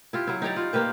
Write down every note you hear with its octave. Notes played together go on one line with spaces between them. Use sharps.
E4 F4 G4
F#3 E4
D#4 G4 C#5 D5
F4
A#3 G4 B4 C5